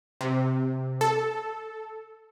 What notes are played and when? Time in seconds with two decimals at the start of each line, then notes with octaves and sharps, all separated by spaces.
0.21 C3
1.01 A4